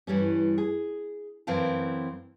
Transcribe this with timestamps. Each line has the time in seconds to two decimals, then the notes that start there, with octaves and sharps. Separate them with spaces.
0.07 G2 E3 G3 C#4
0.58 G#4
1.47 F#2 E3 C4 F5 A5